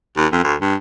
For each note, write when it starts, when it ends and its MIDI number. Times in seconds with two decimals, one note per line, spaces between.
0.17 0.26 39
0.32 0.42 41
0.44 0.54 38
0.61 0.75 43